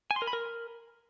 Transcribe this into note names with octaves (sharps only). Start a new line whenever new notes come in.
G#5
C6
A#4
B5
A#4